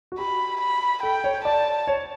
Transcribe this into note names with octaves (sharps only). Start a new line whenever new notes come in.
F#4
G4 B5
B5
A4 G5
C#5
D5 A5
C#5